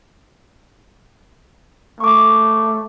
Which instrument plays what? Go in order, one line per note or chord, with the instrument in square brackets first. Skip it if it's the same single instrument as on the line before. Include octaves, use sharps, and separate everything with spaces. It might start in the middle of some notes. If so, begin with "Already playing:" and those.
[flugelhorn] A3 [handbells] C#6 D6